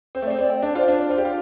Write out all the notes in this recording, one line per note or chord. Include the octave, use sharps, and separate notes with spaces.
C4 C5
A3
C4 D5
C4 D5
G5
D4 D5
F4 C5
D4
D5
F4 C5
G4
F4